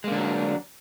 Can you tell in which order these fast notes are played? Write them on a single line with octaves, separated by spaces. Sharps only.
G#3 A#3 D3 D4 F#3